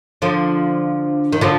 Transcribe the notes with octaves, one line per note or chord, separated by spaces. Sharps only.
D3 F3
D#3
D3 F3